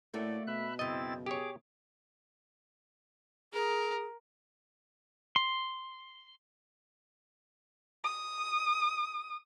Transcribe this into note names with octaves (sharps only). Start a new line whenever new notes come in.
A2 A3 A#3 F#4 D5
B2 E5 B5 F#6
F#2 C#3 C4 E4 D#5 A6
G4 G#4 C#5 D6
G#4 A#4
C6
D#6